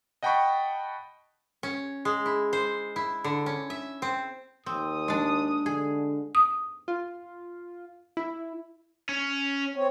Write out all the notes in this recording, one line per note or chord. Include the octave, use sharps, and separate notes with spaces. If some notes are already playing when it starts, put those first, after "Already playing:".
D#5 F#5 G5 A5 B5 C#6
C#4
G#3
E4
C5
E4
D3
C#4
E5
C4
D#2 C4 D#6
G#3 D4
D3 G#4
D#6
F4
E4
C#4
C4 C#5